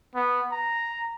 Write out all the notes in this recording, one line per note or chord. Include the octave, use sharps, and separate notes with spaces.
B3
A#5